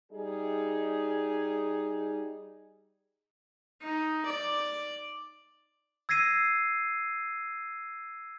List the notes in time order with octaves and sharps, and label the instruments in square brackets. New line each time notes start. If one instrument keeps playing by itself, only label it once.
[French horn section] G3 D#4 G#4
[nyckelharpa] D#4
D5
[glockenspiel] E6 G#6 A#6 C7 D#7